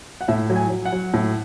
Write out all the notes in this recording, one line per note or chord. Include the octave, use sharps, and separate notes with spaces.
F#5
A2 E5
F#3
G#5
F#3
F#5
F#3
A2